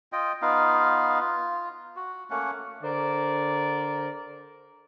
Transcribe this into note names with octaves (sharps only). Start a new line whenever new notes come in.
F4 D#5 G5
B3 D#4 F4 F5
F4
F#4
A3 A#3 C#4 F#5
D3 A#4 C5 D5